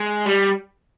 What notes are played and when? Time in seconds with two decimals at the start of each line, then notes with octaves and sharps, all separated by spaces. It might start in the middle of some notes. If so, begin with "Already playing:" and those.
Already playing: G#3
0.26 G3